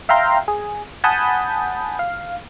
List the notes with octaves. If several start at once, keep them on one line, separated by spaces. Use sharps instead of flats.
E5 F5 G5 A#5 C6
G#4
F#5 G#5 A5 B5 D#6 G6
F5